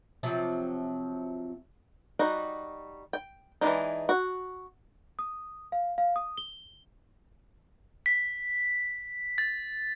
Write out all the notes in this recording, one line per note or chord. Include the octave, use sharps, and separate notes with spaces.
C3 F3 F#3
G3 D#4 F#4
G5
E3 G#3 C4 D4 D#4
F#4
D#6
F5
F5
D#6
G7
B6
A6